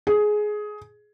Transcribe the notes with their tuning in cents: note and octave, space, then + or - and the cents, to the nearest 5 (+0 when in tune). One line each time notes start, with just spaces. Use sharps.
G#4 +15